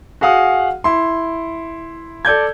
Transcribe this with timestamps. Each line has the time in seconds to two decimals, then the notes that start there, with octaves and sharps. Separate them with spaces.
0.21 F#4 G#4 F5 F#5 D#6
0.84 E4 C6
2.25 A4 D5 G6 G#6